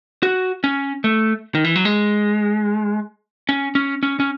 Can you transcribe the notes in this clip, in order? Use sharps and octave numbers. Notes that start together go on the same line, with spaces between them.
F#4
C#4
A3
D#3
E3
F#3
G#3
C#4
C#4
C#4
C#4